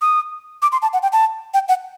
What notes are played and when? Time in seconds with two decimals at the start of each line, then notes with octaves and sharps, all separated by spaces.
0.02 D#6
0.62 D6
0.72 C6
0.82 A5
0.93 F#5
1.03 G5
1.12 A5
1.54 G5
1.68 F#5